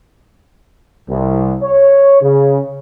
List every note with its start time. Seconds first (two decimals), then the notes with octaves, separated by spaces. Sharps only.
1.09 C2
1.62 C#5
2.22 C#3